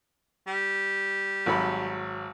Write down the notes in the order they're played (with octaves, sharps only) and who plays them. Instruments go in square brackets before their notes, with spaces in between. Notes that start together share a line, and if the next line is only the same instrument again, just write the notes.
[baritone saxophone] G3
[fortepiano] G#1 F#3 B5